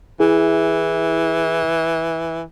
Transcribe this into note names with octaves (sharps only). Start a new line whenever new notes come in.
E3 E4 G#4